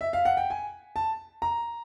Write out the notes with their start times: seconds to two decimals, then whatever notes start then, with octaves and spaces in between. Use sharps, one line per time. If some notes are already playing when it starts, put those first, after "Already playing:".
0.01 E5
0.13 F5
0.25 F#5
0.37 G5
0.50 G#5
0.96 A5
1.42 A#5